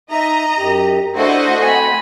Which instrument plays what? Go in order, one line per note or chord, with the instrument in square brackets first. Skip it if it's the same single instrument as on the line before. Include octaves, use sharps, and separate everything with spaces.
[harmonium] D#4 E5 [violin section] D#5 A#5
[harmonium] F#2 G4
[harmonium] A3 D4 [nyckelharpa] E4 A4 [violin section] F#4 C5 D#5
[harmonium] A3 C4 [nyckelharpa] G#5 B5